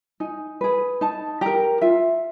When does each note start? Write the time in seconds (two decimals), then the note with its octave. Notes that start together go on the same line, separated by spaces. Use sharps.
0.20 D#4 G#5
0.61 G#4 B4
1.01 D#4 A5
1.41 G4 A#4 A#5
1.81 F4 E5